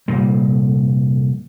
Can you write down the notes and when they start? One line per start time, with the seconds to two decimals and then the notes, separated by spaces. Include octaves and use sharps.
0.08 F1 A#2 G3